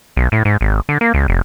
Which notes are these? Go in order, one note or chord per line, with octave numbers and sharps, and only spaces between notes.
B1
A2
G#2
G#1
D3
A#3
C#2
F1